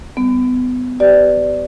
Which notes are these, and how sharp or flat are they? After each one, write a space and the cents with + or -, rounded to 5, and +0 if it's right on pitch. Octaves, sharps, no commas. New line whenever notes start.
G3 +0 B3 +25
G4 -25 B4 +40 D5 +0